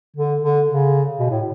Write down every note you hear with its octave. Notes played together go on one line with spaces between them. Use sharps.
D3
D3
C#3
B2
A2